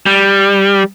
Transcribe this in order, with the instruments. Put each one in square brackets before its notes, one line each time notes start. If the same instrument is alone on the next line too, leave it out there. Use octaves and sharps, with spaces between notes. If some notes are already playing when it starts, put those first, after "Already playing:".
[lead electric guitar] G3